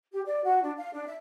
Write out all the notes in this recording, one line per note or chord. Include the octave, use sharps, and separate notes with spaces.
G4
D5
F#4
D4
F5
D4
E5